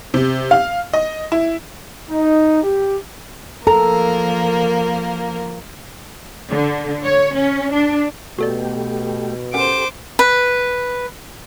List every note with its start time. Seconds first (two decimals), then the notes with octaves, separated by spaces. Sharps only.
0.14 C3
0.51 F5
0.93 D#5
1.32 E4
2.10 D#4
2.63 G4
3.67 F3 A#3 A4 A#4 A#5
6.50 D3
7.04 C#5
7.36 C#4
7.73 D4
8.39 B2 A3 F#4 G4 A4 D5
9.54 C#4 G4 A4 A#4 C5 F#5 D6
10.19 B4